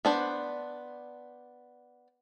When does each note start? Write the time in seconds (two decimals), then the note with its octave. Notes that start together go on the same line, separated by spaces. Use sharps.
0.05 B3 D4 C5